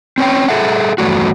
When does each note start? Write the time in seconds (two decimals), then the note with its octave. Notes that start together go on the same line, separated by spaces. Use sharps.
0.18 C4 C#4 C#5 G5
0.49 G#4 A4 E5 F#5
0.98 E2 G2 F#3 A3 F#4